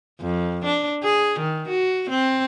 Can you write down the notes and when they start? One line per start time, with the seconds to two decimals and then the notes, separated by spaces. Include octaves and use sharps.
0.21 F2
0.65 D4
1.03 G#4
1.40 D#3
1.69 F#4
2.10 C4